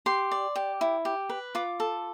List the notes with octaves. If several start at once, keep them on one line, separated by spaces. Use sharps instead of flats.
G4 C6
D5
G4
E4
G4
B4
F4 D6
A4